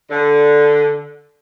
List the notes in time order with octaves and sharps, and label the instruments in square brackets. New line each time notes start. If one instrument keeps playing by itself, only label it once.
[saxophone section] D3